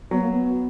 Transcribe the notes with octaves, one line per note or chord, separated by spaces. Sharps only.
F#3 B3
A#3
B3